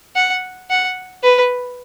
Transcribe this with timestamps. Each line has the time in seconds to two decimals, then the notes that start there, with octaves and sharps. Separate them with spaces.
0.16 F#5
0.70 F#5
1.24 B4